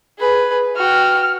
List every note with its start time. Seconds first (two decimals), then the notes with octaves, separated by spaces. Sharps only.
0.19 G#4 B4
0.76 F#4 G5 F6